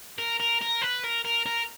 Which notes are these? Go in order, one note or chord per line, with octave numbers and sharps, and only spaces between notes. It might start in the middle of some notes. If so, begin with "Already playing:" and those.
A#4
A#4
A#4
B4
A#4
A#4
A#4